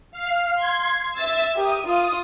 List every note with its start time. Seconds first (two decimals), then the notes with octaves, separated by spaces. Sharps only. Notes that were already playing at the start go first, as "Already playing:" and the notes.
0.12 F5
0.54 C6 G#6
1.17 E5 E6 A6
1.56 G4 A#4 D#6
1.86 F4